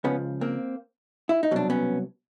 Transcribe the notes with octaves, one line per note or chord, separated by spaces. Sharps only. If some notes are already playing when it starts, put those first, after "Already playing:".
C#2 C#3 F3 B3 C#4
A#3 C4
E4
D#4
C2 B2 F#3 D4
B3 C#4